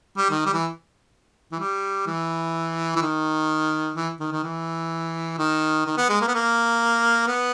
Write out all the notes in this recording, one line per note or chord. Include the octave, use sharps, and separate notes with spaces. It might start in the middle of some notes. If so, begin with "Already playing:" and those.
G3
D#3
G3
E3
E3
G3
E3
E3
D#3
E3
D#3
D#3
E3
D#3
D#3
B3
G#3
A#3
B3
A#3
B3